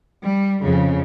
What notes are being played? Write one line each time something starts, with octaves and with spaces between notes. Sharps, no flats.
G3
F2 C#3